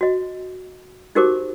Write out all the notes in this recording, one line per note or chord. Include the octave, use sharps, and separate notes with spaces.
F#4 D#5
D#4 F#4 G4 A#4 C5 D6